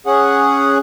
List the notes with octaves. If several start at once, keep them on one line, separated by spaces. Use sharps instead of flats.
C#4 G#4 F#5